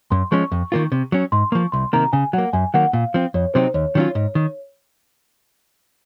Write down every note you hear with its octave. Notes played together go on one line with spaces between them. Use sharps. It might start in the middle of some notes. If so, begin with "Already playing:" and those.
F#2 C6
F3 G#3 C#4 C#6
F2
D#3 A#3 F4
C3
F#3 C#4
G#2 C6
F3 A#3 C#6
C2 C6
C3 D#3 A#3 A#5
C#3 G#5
F#3 A#3 F#5
F#2 G#5
D#3 F#3 A#3 F#5
A#2 F5
F3 C4
F2 C#5
C3 F#3 C4 D#4 C5
D#2 C#5
D#3 F#3 C#4 F4
G#2
D#3